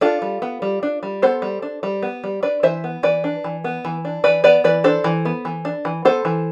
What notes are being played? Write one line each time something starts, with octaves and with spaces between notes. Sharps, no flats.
D4 F4 A4
G3
B3
G3
D4
G3
B3 A4 C5
G3
D4
G3
B3
G3
D4 B4 D5
E3 C5 E5
B3
E3 B4 D5
D4
E3
B3
E3
D4
E3 B4 D5
B3 B4 D5
E3 B4 D5
D4 A4 C5
E3
B3
E3
D4
E3
B3 A4 C5
E3